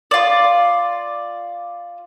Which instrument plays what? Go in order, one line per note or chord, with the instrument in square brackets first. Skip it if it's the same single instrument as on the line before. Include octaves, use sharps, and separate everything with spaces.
[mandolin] F4 D5